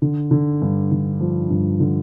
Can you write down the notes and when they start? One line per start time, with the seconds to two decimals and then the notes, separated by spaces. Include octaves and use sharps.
0.02 D3
0.31 D3
0.62 G2
0.92 D3
1.21 F3
1.50 G2
1.80 D3